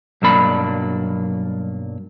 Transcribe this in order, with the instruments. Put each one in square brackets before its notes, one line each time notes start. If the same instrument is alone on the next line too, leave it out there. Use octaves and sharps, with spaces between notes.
[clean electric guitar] B1 G2 F#3 A#3 D4 B5